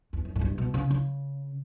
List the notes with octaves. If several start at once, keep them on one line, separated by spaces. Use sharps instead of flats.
E2
F#2
A2
G2
B2
C#3
C#3